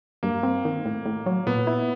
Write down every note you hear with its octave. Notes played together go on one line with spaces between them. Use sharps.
G2 A#3
C4
D#3
A2
A2
F#3
A#2 B3
E4